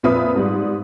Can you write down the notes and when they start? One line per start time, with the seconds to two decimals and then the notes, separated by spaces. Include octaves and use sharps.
0.03 F2 A#2 B4 E5 D#6
0.36 G#2 G3